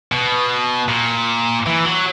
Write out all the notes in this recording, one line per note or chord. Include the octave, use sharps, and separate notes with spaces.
B2
A#2
E3
F#3